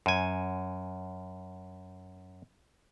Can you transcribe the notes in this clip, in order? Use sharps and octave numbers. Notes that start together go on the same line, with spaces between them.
F#2 G#5